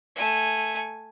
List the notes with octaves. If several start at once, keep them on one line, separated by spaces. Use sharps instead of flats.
A3 G#5